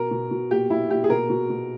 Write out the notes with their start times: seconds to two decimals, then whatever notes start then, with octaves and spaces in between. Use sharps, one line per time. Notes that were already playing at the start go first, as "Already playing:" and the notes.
Already playing: B2 A#4
0.11 B2
0.31 B2
0.51 A#2 G4
0.70 A#2 E4
0.90 A#2 G4
1.04 G#4
1.10 B2 A#4
1.30 B2
1.50 B2